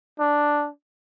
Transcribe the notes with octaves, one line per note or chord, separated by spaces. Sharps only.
D4